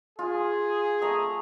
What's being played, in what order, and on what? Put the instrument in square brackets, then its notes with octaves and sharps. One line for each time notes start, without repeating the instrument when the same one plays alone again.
[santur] F4 [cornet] G#4
[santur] A3 A#5 D#6